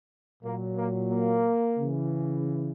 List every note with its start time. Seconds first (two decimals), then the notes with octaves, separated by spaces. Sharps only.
0.44 A#2 F#3 A#3
0.77 A#3
1.11 A#3
1.79 C#3 E3